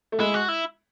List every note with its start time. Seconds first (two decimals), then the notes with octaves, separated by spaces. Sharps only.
0.12 A3
0.20 G#3 E4
0.34 F#4
0.48 E4